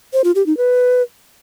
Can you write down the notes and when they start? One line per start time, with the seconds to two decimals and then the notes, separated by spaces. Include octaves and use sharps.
0.13 C5
0.24 F4
0.35 G4
0.46 D#4
0.57 B4